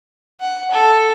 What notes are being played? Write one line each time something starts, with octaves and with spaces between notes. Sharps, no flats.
F#5
A4